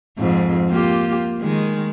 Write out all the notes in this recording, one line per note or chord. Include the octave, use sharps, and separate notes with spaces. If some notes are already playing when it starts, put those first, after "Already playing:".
F2 G#2
A#3 F4 G4
D#3 G#3